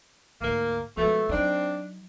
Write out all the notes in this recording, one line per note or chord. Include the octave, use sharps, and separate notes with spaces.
D2 G#2 A#3
B2 F3 G#3 A3
F#3 C4 D4 D#4